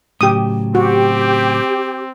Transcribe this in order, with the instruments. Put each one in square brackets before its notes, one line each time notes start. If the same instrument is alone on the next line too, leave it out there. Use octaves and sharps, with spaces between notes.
[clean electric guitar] A2 C#3 F#3 [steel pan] G4 D#6
[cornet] C4 [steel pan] F#4 [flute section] G4